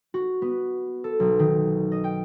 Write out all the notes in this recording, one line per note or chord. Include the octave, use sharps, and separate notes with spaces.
F#4
B3
A4
B1
D#3
D#5
G5